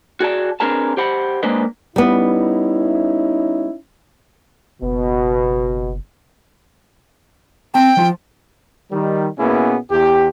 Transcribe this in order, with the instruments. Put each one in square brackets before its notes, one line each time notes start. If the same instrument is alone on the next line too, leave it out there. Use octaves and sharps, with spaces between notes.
[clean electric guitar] F#4 G#4 D5 A5
C4 D4 G#4 A#4 B4 A5
G4 C5 F#5 B5
G#3 A#3 D4 B4 C5 D#5
[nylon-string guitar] G3 B3 [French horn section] C#4 D#4 E4
[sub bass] F#1 [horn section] B2
[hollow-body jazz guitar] C4 A5 [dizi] G5
[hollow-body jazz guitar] F3 F4
[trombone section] D#3 G3
B2 A#3 B3 C#4 E4 G#4
E2 G4